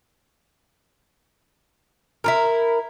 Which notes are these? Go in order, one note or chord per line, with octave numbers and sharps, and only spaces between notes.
E4 F4 A#4